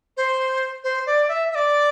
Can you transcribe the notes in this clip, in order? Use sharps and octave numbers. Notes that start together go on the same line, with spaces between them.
C5
C5
D5
E5
E5
D5